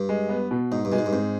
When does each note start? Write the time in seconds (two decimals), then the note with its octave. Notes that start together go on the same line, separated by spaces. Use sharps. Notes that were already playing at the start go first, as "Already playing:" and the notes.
Already playing: G2
0.09 G#3
0.29 B3
0.51 B2
0.72 G#2 D#4
0.85 G2
0.92 B2 G#3
0.98 G#2
1.06 G2
1.12 G#2 C4